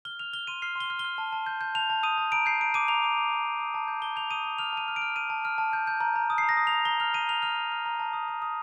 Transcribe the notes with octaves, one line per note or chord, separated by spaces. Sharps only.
F6 G7
F6 F7
F6 G7
C6 D#7
F6 C7
C6 G7
F6
G7
F6
A5
A5
G6
G6
A5 F7
A5
D#6 D#7
A5
A#5 D7
G6 C7
A#5 D7
D6 D#7
A#5 F7
D6
D6
A#5
A5
D#6
A5
G6
A5 G7
G6 F7
D#6 D#7
D#6
F6 F7
A5 D#7
F6
D7
F6
F6 D#7
A5
F6
A5
G6
G6
A#5
A#5
D#6
A#5 C7
A#6
D#6
F7
A#5
A#5 G7
F6 F7
A#5 D#7
F6 F7
F6 F7
A#5
F6
A#5
A5
D#6
D#6
D#6